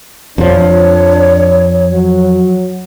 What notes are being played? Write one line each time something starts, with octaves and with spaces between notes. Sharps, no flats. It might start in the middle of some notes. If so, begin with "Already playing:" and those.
F2 F3 D4 C#5
F#3